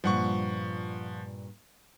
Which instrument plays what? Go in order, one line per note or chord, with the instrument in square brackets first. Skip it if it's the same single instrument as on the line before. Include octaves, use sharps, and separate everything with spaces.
[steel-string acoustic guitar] G2 A#2 [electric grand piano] F3 F#5 C#6